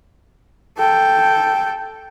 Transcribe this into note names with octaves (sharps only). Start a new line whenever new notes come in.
A4 G5